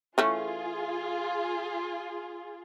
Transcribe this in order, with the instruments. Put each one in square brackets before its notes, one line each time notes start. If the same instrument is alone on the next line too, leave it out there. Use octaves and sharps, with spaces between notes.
[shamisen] E3 A3 C#4 [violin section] F4 G#4